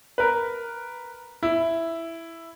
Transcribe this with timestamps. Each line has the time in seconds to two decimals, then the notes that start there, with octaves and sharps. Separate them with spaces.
0.18 A#4 B4
1.43 E4